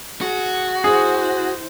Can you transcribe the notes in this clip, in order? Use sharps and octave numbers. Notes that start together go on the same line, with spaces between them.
F#4 G#4
E4 G#4 C5